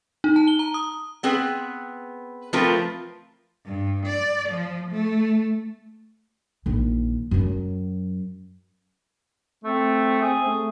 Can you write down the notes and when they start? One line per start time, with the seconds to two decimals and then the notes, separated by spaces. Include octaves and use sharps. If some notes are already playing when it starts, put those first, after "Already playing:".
0.24 D#4
0.36 A5
0.48 G7
0.59 A#5
0.74 D#6
1.23 B3 C4 G#4 B4
2.53 F3 A3 C4 F4 A#4 B4
3.66 G2
4.06 D5
4.50 F3
4.91 A3
6.66 A#1 D#3
7.31 F#2 F#3
9.64 A3 C4
10.21 G#4
10.46 A3